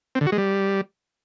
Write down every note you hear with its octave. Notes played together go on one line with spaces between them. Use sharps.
C4
D3
F#4
G#3
G3